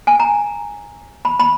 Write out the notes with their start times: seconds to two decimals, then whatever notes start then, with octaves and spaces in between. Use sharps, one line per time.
0.07 G#5
0.20 A#5
1.25 B5
1.40 B5